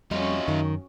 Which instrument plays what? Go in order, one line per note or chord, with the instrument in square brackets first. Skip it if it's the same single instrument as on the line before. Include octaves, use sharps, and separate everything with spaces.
[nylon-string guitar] F2 [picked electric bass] G3 [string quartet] C#4 F#4 [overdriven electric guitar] D#4 F4
[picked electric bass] F#2 [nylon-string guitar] D#3